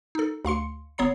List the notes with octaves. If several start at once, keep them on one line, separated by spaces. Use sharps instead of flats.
D#4 A4
D2 F5 C6 C#7
G1 B3 C#5 A#5 C7